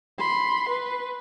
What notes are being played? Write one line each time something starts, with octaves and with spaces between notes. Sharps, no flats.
B5 C6
B4